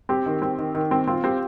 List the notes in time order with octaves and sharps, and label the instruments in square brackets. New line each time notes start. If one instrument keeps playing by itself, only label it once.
[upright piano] C4 [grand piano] G4
[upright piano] D#3
C4
D#3
D#3
C4
[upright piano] C4 [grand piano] F4
[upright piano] C4 [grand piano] G4